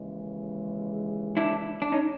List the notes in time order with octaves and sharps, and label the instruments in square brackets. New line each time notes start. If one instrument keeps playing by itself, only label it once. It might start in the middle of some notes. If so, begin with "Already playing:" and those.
Already playing: [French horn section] D#2 C#3 E3 G#3
[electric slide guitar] D4 E4
D4
C#4 D#4